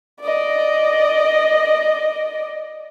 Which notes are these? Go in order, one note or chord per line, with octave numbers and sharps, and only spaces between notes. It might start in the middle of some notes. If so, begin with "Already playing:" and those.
D5 D#5